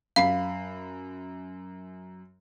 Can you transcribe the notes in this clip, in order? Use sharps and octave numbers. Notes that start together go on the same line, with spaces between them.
F#2 F5 B5 C7